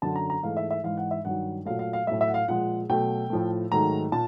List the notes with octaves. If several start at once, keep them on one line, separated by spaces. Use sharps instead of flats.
F#2 D3 F#3 A5
A#5
A#5
G#2 E3 A3 F5
E5
E5
G#2 E3 G#3 F5
F#5
E5
G2 D#3 F#3 F#5
A#2 F#3 A3 F5
F5
F5
A2 F#3 A3 E5
E5
F#5
F5
A#2 F3 G#3 F#5
B2 F#3 A3 G5
A2 F3 A3
G#2 D#3 F#3 A3 A#5
A#2 A5